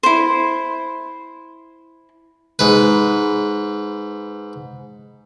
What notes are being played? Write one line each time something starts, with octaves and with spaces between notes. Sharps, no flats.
E4 C5
G#2 B4